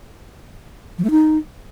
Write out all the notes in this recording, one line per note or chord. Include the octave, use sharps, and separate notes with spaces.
F3
A3
D#4